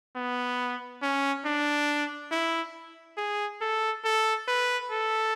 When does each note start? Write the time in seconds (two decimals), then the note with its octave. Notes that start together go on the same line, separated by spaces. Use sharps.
0.16 B3
1.02 C#4
1.45 D4
2.32 E4
3.17 G#4
3.61 A4
4.04 A4
4.48 B4
4.91 A4